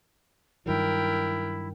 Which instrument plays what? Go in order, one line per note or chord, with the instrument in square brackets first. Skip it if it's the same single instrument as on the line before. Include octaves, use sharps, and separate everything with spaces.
[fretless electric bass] G2 D#3 F#3 [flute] E4 [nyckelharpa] A#4 G5